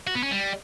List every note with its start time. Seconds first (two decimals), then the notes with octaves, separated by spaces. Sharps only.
0.07 F#4
0.15 B3
0.23 C#4
0.31 G3